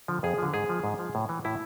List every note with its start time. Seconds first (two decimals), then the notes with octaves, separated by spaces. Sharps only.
0.08 D3 F3
0.23 F2 G#4
0.38 D3 F3
0.54 G#2 G#4
0.69 F3
0.84 G#2
0.99 F3
1.15 A2
1.29 E3
1.45 A2 E4